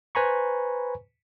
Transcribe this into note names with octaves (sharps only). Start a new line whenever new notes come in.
B4 C5 G#5 A#5 B5 C#6